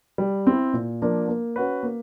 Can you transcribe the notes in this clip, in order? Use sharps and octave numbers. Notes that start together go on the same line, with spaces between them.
G3
C4 E4
A#2
F3 A#3 D4
A#3
C#4 F#4 B4
A#3